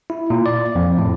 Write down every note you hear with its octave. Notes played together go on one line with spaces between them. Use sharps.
E4
A#2
D5
F2
A2